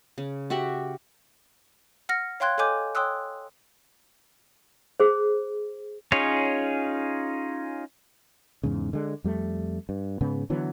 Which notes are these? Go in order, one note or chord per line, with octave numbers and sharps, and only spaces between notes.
C#3
F#4 G4 E5 F#5
F#5 F6 A#6 C#7
C#5 F5 G5 C6 F#6 G#6
A4 C#5 D#5 G#5 D6 G6
C#5 G5 C6 D#6 E6 F#6
G#4 C5
C#4 D#4 F4 G#4 C#5
E2 G#2 C#3
D3 G#3
F2 G3 A3
G2
G#2 C#3 B3
D3 E3 F#3 B3